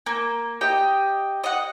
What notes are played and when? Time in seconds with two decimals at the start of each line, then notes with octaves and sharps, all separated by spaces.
0.06 A#3
0.61 G4 D#5 G5
1.44 D#5 F#5